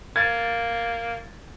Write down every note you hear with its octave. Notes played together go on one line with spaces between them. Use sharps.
A#3 G#6 A6